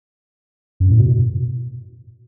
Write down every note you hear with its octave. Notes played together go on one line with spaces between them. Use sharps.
F#2
A2
B2